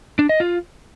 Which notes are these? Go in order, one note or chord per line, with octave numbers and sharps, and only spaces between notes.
D4
D#5
F4